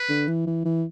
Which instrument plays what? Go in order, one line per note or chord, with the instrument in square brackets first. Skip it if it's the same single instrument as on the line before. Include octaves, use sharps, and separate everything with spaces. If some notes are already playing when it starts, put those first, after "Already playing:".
Already playing: [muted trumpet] B4
[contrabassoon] D3
E3
E3
E3